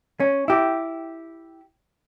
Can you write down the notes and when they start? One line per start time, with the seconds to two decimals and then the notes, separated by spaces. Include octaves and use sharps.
0.20 C#4
0.48 E4 G4